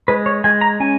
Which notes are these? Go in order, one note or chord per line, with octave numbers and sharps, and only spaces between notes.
G#3 B4
C#5
G#3 G#5
A#5
C#4 G#5